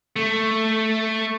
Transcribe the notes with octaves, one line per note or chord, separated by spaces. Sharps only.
A3